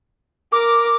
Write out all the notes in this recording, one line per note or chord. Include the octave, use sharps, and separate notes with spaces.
A#4 D6